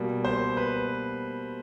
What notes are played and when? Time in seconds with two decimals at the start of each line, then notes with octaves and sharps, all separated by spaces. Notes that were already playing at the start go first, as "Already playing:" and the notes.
Already playing: B2 G3 A#3
0.25 C5
0.57 B4